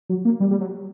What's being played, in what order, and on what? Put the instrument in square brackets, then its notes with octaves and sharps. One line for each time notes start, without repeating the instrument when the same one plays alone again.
[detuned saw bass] F#3
A#3
G3
G3
F#3